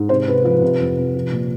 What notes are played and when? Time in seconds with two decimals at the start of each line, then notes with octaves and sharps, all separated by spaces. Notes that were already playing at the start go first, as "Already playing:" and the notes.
Already playing: G#2
0.09 C3 C5
0.27 C3 B4
0.44 F3 B4
0.62 C3
0.80 F2
0.97 C3
1.15 F3
1.32 A#2